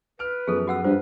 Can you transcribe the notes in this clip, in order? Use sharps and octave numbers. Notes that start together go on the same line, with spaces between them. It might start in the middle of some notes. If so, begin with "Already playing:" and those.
B4 F6 D7
F#2 F3 B3 G#4 A4
F#4 B4 F#5 E6
G2 F4 B4 C5